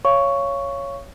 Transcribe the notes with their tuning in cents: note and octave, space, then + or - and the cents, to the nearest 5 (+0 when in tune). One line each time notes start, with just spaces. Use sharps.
C#5 +0 F5 -30 C#6 +5